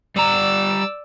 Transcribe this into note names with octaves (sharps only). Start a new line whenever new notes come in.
G3 D5 A#5 E6